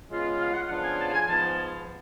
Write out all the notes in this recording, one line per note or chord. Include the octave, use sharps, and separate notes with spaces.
C#3 G#3 B3 F4
F5
F#5
C#3 F3 B3 D4 F4 F#5
G#5
A5
G#5
G#2 F3 B3 A5